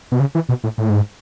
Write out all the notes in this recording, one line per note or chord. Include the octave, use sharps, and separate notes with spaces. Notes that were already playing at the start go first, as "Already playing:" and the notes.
B2
C#3
E3
B2
A2
A2
G#2